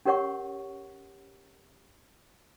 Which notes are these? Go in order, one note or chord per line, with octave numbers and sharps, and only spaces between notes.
C#4 G4 A#4 C#5 F#5 C#6